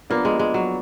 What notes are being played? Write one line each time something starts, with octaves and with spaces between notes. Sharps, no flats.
F3 A#3 B3 D4
G#3
G#3
F#3